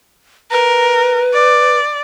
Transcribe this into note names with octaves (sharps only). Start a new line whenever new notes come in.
A#4 B4
D5